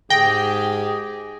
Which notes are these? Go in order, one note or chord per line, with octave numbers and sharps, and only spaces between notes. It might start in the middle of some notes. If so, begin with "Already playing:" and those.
G#2 G4 G#4 G5 A#6